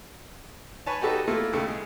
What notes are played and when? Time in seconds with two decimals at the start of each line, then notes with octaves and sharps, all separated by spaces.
0.86 B4 C#5 G#5 A5
1.01 D#4 F#4 G4 A4 B4
1.28 A3 A#3 E4 F4
1.53 D#2 C#3 A3
1.68 G#3